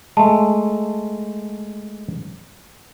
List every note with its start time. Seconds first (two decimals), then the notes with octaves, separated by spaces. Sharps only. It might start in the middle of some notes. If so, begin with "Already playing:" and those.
0.17 G#3 A3 A5